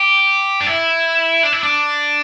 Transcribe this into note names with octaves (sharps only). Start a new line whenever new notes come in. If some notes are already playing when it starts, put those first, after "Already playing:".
Already playing: G4
D4
E4
D4
E4
D4